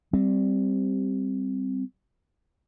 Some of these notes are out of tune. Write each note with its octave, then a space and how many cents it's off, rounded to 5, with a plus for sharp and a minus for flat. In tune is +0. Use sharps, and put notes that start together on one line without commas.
G3 +0 C4 +0